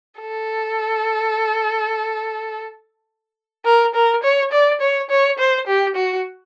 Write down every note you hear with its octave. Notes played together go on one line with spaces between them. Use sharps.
A4
A#4
A#4
C#5
D5
C#5
C#5
C5
G4
F#4